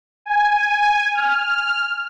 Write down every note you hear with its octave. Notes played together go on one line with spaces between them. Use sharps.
G#5
F6